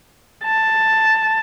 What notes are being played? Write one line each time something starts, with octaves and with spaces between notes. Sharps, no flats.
A5